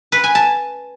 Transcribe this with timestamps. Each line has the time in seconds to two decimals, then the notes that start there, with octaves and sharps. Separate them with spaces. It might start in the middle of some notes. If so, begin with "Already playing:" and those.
0.12 B4
0.24 G#5
0.35 A5